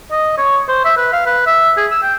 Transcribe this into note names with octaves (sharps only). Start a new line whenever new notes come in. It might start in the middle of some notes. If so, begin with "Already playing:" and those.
D#5
C#5
C5
E5
B4
F5
B4
E5
G#4
E6
G5